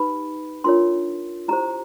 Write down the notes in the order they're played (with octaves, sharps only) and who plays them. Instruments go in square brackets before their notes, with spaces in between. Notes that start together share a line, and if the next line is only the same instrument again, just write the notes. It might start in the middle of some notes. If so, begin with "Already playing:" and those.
Already playing: [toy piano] D#4 G4 B4 B5
D4 F4 A#4 C#5 C6
E4 G4 C5 A#5